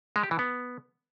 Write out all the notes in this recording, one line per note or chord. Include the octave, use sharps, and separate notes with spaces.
G#3
G4
E3
B3